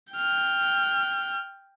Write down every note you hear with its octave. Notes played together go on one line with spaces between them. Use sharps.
G5 F6